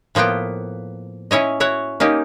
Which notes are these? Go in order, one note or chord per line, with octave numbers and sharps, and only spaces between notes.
A2 F3 A#3 B3 G5
C#4 E4 C#5 D#5
E4 F#4 C#5 F#5
A#3 C#4 D#4 G4